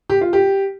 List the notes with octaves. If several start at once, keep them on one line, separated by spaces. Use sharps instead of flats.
G4
F4
G4